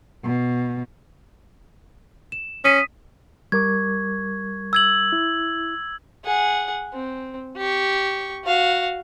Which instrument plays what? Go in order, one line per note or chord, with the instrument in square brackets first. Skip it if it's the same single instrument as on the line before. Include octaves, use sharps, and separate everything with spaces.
[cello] B2
[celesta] E7
[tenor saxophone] C#4 [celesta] D#6 B6 D#7
[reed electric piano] G3 A#4 D6 [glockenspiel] C#6 G#6
[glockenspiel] E6 G#6 F#7
[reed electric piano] E4
[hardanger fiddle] G#4 F#5
C4
G4 C#6
F#4 F5